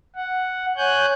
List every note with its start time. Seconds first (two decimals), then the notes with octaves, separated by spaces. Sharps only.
0.15 F#5
0.77 C#5 G#5 F#6 G6